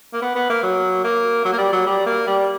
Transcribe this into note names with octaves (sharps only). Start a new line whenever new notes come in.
A#3
B3
B3
A#3
F#3
A#3
F#3
A#3
G3
F#3
G3
A#3
G3